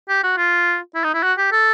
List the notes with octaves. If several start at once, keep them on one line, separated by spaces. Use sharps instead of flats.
G4
F#4
F4
E4
D#4
E4
F#4
G4
A4